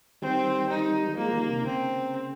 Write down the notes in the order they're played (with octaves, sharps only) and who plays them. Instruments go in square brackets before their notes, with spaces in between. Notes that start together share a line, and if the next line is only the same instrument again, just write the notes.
[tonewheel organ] D#3 G3 [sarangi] C4
[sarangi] D#4
[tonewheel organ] F3 G#3 [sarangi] A#3
[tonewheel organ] D#3 G3
C3 D#3
[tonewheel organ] C#3 [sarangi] C4